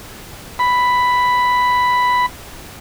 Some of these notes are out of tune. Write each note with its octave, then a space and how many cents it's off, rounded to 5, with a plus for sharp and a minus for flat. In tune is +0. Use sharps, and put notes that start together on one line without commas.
B5 +5